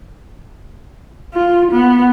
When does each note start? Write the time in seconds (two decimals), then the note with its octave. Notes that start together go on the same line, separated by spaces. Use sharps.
1.34 F4
1.71 B3